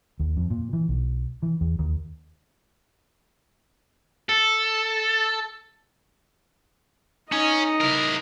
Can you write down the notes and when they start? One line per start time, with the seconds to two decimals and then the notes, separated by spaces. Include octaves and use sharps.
0.20 D#2
0.37 F2
0.51 A#2
0.73 E3
0.89 B1
1.43 E3
1.61 E2
1.79 D#2
4.29 A4
7.32 C#4 D#4 D#5
7.81 E4 A#4